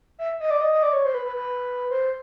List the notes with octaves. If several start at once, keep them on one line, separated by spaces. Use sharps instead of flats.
E5
D#5
D5
D#5
D#5
D5
C#5
C5
B4
B4
B4
C5